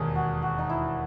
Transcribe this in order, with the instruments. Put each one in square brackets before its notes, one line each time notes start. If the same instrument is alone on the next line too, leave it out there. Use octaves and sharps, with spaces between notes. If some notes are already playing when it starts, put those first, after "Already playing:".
Already playing: [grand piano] E1 D#2 D#3 [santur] G#4
[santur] F#4
F#4
D#4
E4